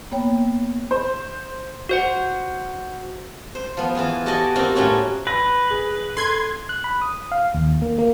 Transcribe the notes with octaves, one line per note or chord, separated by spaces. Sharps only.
A#3 B3 C#5 G5
C5
F#4 C5 F#5
C5
F3 B3
E3 F4 G#4
F#4 G4 A4 D5 D#5 G#5
G3 A#3 C4 D#4 F4 F#4
A2 A3 C#4 F#4 C#5
B4 A#6
G#4
A4 C6 G#6
F#6
B5
D#6
F5
D#2
A#3
A#3